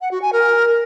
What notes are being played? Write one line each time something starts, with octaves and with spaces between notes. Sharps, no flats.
F#5
F#4
G#5
A#4